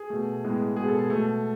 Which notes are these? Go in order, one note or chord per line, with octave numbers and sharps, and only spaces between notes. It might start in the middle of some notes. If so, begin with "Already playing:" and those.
Already playing: G#4
B2 A3
A2 G#3 B3
B2 G#3 B3 G#4
A4
G#4
B2 A3 A4